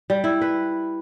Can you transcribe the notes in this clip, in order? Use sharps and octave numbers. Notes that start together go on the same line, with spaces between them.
G3
E4
B4